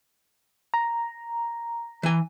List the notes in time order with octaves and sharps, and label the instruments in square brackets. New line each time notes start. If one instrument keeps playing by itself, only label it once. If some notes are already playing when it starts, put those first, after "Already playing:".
[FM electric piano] A#5
[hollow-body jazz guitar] E3 G#5